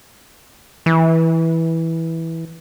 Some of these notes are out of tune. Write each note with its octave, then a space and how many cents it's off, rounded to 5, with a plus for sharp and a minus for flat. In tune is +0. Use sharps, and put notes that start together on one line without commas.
E3 -10